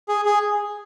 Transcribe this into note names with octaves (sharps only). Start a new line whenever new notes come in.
G#4
G#4